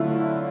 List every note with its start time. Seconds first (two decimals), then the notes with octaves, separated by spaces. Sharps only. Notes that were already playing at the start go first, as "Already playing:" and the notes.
Already playing: D3 F#3 A3 E4 F4